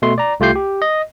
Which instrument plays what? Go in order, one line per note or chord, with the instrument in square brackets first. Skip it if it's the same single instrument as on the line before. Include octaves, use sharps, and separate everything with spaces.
[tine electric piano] B2 A3 C6
D5 A#5
C2 A3 F4 G4 G6 C7
G4
D#5